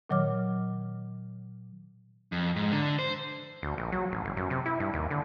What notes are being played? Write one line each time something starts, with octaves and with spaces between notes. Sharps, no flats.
A#2 D#3 F#3 C#5 D6 F6
F2
G#2
D3
C5
D2
A#1
F#3
A1
G1
F#2
C3
E4
G2
D#2
D3